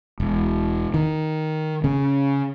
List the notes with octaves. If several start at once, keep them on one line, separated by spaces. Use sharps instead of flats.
E1
D#3
C#3